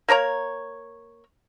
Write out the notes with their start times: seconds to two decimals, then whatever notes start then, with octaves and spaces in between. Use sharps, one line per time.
0.09 A#3 A#4 C#5 A#5